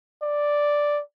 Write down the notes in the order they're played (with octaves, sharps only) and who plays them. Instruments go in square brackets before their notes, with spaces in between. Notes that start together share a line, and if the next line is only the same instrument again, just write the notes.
[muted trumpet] D5